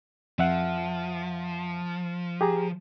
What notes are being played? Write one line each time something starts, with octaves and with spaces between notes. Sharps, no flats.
F2 F3 E5 F#5
G4 G#4 A#5